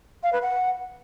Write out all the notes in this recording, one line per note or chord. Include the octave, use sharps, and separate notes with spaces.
F5
B4
F#5